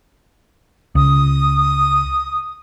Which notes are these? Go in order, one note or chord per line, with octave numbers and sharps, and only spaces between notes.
C#2 D#6